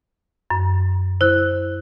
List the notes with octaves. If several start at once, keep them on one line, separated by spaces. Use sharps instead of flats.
F#2
E4 C5 F#6